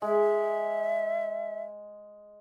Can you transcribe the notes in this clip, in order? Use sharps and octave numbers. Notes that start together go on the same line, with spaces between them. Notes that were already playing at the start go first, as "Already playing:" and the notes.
G#3 E5